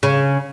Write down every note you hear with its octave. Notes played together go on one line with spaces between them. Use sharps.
C#3